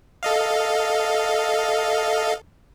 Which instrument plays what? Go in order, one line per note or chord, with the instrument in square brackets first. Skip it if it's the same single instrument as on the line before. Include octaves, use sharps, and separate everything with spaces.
[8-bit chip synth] A4 D#5 F5